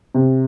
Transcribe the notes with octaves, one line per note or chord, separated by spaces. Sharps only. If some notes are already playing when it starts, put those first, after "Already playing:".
C3